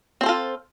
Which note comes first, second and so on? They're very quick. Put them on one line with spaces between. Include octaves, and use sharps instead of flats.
C4 C5 A4 F4